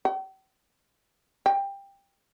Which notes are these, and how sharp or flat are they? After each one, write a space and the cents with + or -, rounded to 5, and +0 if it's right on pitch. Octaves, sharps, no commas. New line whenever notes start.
G5 -40
G5 +15